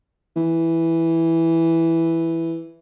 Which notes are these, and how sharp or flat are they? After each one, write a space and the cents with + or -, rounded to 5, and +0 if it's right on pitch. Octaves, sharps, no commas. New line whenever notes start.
E3 +0